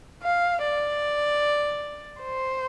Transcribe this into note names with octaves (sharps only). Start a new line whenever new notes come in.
F5
D5
C5